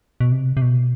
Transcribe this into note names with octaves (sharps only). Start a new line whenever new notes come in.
B2
C3
C3
B2